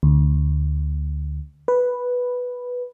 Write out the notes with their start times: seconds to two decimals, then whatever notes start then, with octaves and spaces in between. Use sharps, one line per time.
0.03 D2
1.68 B4